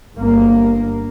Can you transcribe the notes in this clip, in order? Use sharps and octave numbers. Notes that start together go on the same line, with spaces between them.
G1 A#3